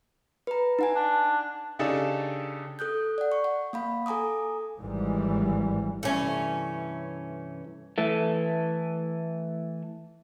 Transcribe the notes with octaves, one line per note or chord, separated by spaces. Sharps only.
B4 A#5
D#4 F#5 G#5
D4
C#3 D4 D#4 G4 A4 A5
A4 D#6 F#6 G6
D5 F#5
C#6
F#5
A#3 F5 B5
A4 G#5 A#5 D6 D#6
G#1 G#2 E3 G3
G2 C3 E3 A3 C#4
E3 A3